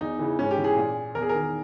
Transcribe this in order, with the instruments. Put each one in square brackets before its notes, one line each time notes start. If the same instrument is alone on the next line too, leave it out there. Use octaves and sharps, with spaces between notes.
[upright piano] E2 D#4
C#3 E3
G#2 C#4
G4
E3
G#4
A#2
E2 A#4
G#4
D#3 A#4